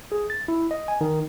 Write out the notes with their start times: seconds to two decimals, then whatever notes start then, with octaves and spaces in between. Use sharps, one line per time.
0.12 G#4
0.30 A6
0.48 E4
0.71 D#5
0.88 G#5
1.01 D#3